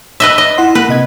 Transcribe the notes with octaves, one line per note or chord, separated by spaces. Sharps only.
B4 D#5 E5
D#5
E4 F#5 C6
A#3 B4
C3 D#5 G#6